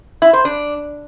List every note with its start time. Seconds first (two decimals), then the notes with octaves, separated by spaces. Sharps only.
0.22 E4
0.33 C5
0.45 D4